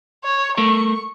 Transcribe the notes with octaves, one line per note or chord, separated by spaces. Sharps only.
C#5
A3 A4 A#4 C#6